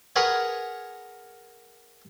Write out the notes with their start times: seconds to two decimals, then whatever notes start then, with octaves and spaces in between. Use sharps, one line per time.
0.16 G#4 A#4 B4 C#5 F#5 G#5